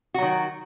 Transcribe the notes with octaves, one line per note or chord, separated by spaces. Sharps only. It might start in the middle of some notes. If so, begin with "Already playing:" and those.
D#3 F#3 F#4